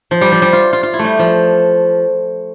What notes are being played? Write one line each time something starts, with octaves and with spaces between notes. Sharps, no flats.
F3
G3
F3
G3
F4
F4
F4
E4
G3 A3
F3